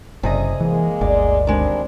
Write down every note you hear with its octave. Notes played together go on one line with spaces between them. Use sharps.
F#1 C3 G#4 D#5
E3 G#3 A#3
G1 D2 D5
D#3 G3 G#3 C4 D4